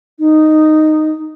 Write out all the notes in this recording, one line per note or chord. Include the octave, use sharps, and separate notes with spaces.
D#4